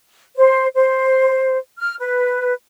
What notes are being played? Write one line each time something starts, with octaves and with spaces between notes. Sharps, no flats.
C5
C5
F6
B4